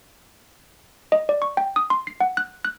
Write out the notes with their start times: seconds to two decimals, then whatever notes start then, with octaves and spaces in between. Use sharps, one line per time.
1.12 D#5
1.29 D5
1.42 C#6
1.57 G5
1.76 D#6
1.90 C6
2.07 C7
2.20 F#5
2.37 F#6
2.65 F#6